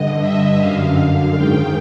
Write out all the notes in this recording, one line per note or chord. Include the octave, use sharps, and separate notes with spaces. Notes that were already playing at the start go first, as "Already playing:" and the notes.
Already playing: G2 D3 D#5
E5
F#2 D3 F5
G#2 D#3 G5